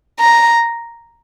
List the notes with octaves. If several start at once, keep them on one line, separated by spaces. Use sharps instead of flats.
A#5